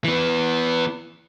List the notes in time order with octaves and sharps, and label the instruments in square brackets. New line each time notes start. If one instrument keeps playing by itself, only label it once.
[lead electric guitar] E3 B3